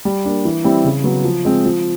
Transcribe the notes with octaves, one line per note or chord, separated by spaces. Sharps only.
G3
A#3 D4
E3
G3 C4 E4
C#3
F#3 B3
F3
G#3 C4
F3